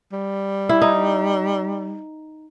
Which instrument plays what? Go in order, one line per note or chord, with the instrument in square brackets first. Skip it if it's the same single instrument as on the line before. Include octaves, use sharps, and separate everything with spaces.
[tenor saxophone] G3
[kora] E4
D#4